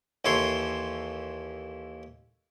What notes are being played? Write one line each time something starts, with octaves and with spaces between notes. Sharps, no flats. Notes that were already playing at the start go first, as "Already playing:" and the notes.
D#2 E3 A4 C#5 C6